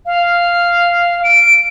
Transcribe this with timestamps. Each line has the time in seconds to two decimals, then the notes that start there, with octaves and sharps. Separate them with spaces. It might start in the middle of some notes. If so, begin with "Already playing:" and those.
0.06 F5
1.24 D7